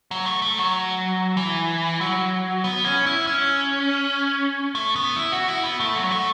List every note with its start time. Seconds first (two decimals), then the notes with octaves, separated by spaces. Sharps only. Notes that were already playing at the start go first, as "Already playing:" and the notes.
0.11 F#3
0.26 A3
0.42 A3
0.58 F#3
1.37 E3
2.01 F#3
2.64 B3
2.84 C#4
3.06 E4
3.27 C#4
4.75 A3
4.96 B3
5.16 E4
5.32 F#4
5.48 E4
5.64 B3
5.80 A3
5.96 F#3
6.11 A3